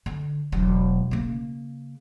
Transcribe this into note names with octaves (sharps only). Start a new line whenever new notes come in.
D3
E1 F#3
C#3 A#3